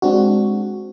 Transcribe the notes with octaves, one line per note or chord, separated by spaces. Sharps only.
G#3 C4 D4 F#4